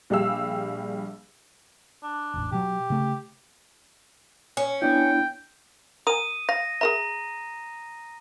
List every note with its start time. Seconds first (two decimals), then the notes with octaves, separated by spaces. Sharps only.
0.10 A#1 G3 G4 G#4 F5 E6
2.03 D4
2.34 E1 A1
2.52 B2 F#3 G4
2.90 C#3 A3
4.57 C#4
4.82 B3 D4 E4 G5
6.07 A#4 G#5 D#6 D#7
6.49 F5 A#6
6.81 G#4 A#4 E5 A#5